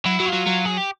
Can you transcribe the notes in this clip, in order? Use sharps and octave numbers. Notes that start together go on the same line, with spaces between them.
F#3 E4
F#3
F4
F#3
F#3
G#4
G4